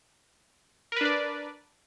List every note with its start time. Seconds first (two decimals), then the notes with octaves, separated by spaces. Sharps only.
0.92 A#4
0.96 B4
1.01 D4
1.05 D5